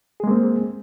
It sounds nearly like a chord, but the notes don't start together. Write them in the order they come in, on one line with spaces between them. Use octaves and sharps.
G#4 G#3 A#3 C4